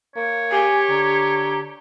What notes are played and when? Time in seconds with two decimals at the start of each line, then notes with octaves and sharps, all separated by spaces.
0.16 A#3 C#5
0.52 G4 G#5
0.89 D3 A#5